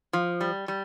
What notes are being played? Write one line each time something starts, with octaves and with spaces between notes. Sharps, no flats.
F3
G3
G3